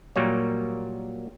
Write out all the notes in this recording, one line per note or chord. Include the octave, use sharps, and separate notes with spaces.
A#2 F#3 G3 A#3 C#5